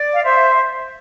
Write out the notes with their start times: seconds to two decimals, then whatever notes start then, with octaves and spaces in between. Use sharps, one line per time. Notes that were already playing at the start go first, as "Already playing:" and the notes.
Already playing: D5
0.13 F5
0.24 C5 E5